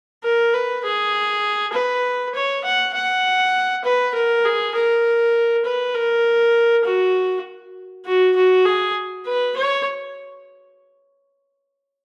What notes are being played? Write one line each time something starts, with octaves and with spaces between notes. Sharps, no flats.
A#4
B4
G#4
B4
C#5
F#5
F#5
B4
A#4
G#4
A#4
B4
A#4
F#4
F#4
F#4
G#4
B4
C#5